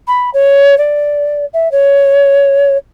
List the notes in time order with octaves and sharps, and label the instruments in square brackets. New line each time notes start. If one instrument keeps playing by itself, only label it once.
[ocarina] B5
C#5
D5
E5
C#5